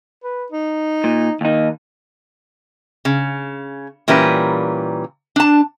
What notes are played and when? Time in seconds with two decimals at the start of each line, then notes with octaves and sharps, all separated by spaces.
0.24 B4
0.52 D#4
1.04 A#2
1.41 D#2 D#3 D#4
3.05 C#3
4.08 A#2 E3 G3 C#4 A#4 B4
5.36 D4 A5